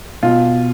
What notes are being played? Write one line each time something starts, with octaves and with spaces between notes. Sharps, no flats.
B2 F4